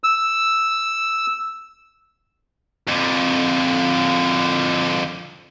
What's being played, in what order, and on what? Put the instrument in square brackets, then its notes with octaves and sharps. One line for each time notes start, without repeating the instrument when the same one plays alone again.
[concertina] E6
[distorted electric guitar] F2 D3